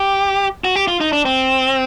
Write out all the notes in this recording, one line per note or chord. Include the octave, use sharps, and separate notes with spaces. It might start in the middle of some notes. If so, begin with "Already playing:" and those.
Already playing: G4
F#4
G4
F4
D#4
D4
C4